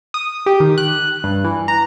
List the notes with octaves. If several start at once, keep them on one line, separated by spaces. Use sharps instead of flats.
D#6
G4
D#3
F#6
G2
E3
A#5